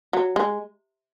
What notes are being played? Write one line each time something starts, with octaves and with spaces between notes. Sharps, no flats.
F#3
G#3